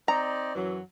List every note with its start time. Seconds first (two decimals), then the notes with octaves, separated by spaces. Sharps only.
0.08 C4 D#4 D5 A#5
0.55 F#2 E3 F#3